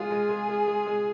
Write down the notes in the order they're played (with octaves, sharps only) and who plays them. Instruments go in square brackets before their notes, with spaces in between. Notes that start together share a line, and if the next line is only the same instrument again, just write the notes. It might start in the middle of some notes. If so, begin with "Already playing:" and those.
Already playing: [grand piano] G#3 F4 [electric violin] G#4
[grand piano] G#3
G#3
G#3
G#3
G#3